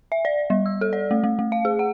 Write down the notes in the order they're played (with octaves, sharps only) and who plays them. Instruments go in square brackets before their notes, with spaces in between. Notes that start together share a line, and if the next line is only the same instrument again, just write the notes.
[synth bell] E5
D5
G3
E6
A4
D5
A3
A3
A3
F5
G#4
F#5